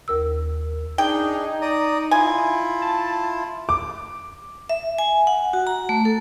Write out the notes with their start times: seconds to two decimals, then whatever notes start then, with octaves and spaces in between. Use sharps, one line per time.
0.08 D#2 A#4 E6
0.98 D4 D#4 G#4 G5
1.62 D5 A#5 D#6
2.11 E4 F4 G#5
2.82 A5
3.69 D6
4.70 E5
4.99 G#5
5.27 F#5
5.53 F#4
5.67 A#5
5.89 A3
6.05 A4